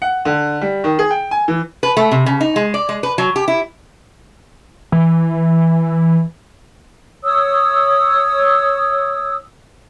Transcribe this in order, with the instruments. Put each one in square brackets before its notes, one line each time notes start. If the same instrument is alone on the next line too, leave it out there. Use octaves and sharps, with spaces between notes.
[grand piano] F#5
D3
G3
D#3
G#4
G5
G#5
E3
[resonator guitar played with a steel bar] B4
A3
C3
C#3
D#4
G#3
D5
G#3
B4
F#3
G4
E4
[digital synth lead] E3
[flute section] C#5 D#6 E6